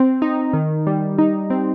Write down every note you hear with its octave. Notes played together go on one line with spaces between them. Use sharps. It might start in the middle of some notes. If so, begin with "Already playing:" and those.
Already playing: C4
D#4
D#3
G3
D#4
C4